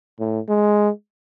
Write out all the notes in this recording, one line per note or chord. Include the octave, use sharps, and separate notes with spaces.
A2
G#3